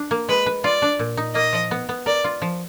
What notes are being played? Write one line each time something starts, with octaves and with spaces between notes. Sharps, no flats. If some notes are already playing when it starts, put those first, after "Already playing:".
Already playing: D4
A#3
G#3 B4
B4
F4 D5
D4
A#2
D#4
A#3 D#5
F3
B3
B3
A#4 D5
F4
F3